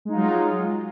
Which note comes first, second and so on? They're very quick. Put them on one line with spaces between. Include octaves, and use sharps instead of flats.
G#3 D#4 F4 F#3